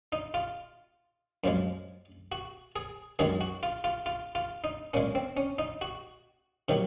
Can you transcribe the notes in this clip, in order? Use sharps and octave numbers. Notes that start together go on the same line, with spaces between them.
D#4
F4
F#2 F3 G#3
F#4
G#4
F#2 D#3 G#3 G#4
F#4
F4
F4
F4
F4
D#4
A#2 G#3 C#4
C4
C#4
D#4
F#4
C3 D#3 F#3